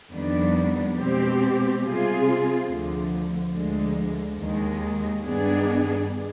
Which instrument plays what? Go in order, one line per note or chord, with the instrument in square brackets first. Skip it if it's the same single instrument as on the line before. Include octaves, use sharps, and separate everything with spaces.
[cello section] F2 D#3 G3 B3 D4
B2 G#3 C4 G4
C3 G3 C4 F4 G#4
D2 D3 F3
D2 D3 F3 G#3
D#2 D#3 G#3
G2 D#3 B3 D4 G#4